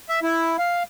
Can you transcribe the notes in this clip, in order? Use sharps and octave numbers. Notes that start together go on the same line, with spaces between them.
E5
E4
F5